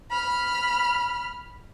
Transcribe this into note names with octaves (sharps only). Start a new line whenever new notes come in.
B5 F6